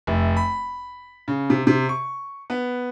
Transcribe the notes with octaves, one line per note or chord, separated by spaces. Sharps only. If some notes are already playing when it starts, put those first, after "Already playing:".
F1
B5
C#3
C3
C3
C#6
B3